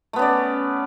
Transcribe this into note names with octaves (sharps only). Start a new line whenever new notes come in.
A3 B3 C#4 D5